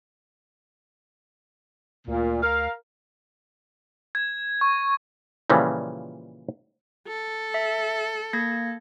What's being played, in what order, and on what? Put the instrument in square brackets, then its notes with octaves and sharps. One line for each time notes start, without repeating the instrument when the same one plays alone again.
[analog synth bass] D2 [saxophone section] A#2
[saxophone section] A#4 F5
[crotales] G#6
C#6
[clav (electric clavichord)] A#2 C#3 E3 F3 G3
[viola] A4
[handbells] E5
A#3 G#6 A#6